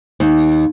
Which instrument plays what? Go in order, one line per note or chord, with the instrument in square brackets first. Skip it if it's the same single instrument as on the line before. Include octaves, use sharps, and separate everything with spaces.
[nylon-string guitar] D#2